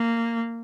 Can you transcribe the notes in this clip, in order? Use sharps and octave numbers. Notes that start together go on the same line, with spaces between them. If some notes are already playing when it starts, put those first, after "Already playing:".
Already playing: A#3